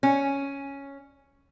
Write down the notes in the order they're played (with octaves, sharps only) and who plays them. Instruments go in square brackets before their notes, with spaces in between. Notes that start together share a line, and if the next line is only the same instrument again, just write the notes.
[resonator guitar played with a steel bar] C#4